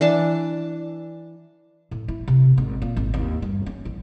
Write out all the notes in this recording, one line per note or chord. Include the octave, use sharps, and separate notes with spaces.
E3 D4 A5
A2
E4
C3
G#1
A#2
G#1
D#2
G2
C#4
A1